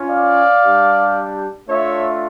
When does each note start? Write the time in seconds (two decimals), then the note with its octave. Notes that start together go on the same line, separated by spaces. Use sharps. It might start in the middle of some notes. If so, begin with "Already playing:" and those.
Already playing: C#4 F4
0.10 D5 F5
0.63 G3 D4 G4
1.68 A3 D4 F4 C#5 E5